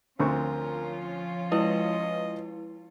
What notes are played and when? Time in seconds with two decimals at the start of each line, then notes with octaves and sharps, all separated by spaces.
0.20 D2 F3 C4 C#4 F4 A#4 C#6
1.52 G#3 E4 B4 D#5